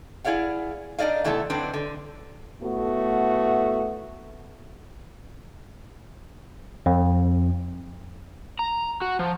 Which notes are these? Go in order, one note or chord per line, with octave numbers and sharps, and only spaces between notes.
E4 G#4 D5 F5 F#5
D4 D#4 D5 D#5 F5
C3 E3 A3 B3 F4 A4
D3 F#3 C4 D4 B4
D3
A2 A3 B3 F#4
F2
A#5
F#4
F3